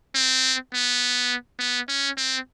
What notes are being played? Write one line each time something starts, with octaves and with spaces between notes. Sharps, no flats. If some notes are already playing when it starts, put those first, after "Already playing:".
C4
B3
B3
C#4
C4